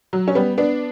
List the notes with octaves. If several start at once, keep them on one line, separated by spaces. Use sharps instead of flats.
F#3
C#4
G3 B3
B3 D4